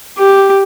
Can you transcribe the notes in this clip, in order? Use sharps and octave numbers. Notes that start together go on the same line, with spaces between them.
G4